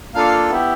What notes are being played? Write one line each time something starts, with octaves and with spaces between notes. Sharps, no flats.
A#3 D4 F4 A4 F5
B3 E4 G4